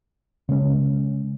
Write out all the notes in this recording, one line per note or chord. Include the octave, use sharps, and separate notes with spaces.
C#3 G#3 C#4